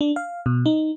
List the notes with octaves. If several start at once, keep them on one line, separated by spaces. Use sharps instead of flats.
D4
F5
B2
D#4